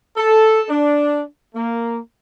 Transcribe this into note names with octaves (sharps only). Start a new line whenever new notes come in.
A4
D4
A#3